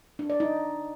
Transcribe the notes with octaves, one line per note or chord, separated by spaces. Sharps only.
D4
D5
D#4